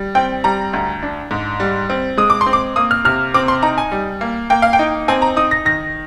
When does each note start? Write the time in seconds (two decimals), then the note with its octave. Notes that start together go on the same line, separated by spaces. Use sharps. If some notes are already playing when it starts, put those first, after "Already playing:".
Already playing: G3
0.15 C4 G5
0.44 G3 A#5
0.73 D2
1.03 D4
1.31 G#2
1.60 G3
1.90 C4
2.17 G#3 D#6
2.30 D6
2.41 C6
2.46 C4
2.53 D6
2.76 A#3 D#6
2.91 F6
3.05 C3 F6
3.34 C4 D6
3.48 C6
3.63 D#4 A#5
3.78 G#5
3.92 G3
4.21 A#3
4.50 A#3 G5
4.62 F5
4.73 G5
4.79 D#4
5.08 C4 G#5
5.22 A#5
5.36 D#4 D#6
5.51 A#6
5.65 D#3 A#6